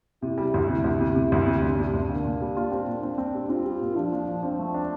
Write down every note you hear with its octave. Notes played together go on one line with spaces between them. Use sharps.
C3 E4
G3
D2
C3 E4
D2
C3
C3
D2
C3
D2 D4
C3
D2
A#2 D4
A#2
G3
F4
C4
A#2
C4 D4
C4
G3
C4 F4
G3
A#2
F3 D4
F3
F3
F3 C4
A3
D4